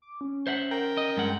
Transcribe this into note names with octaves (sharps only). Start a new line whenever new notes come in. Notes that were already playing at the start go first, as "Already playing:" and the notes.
D6
C#4
C5 E5 F#5
A#4 G5
D#5
G2 G#3 F#5